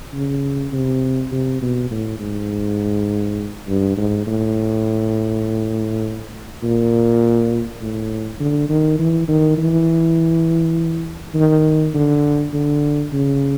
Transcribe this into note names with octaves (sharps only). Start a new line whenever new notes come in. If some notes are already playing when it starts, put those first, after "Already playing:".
C#3
C3
C3
B2
A2
G#2
G2
G#2
A2
A#2
A2
D3
D#3
E3
D#3
E3
D#3
D3
D3
C#3